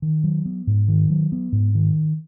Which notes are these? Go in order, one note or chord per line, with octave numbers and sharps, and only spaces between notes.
D#3
F#3
B3
G#2
D#3
F#3
B3
G#2
D#3